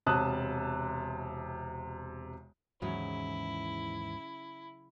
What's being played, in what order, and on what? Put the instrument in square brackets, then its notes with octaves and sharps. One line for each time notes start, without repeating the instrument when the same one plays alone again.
[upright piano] E1 C3 A5 D#6 F#6
[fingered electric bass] D#2 G#2 E3 [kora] C#3 F#3 C#4 [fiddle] E4